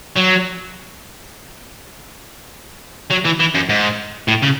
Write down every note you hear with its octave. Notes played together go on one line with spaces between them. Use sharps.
F#3
F#3
E3
E3
F#2
G#2
A2
C#3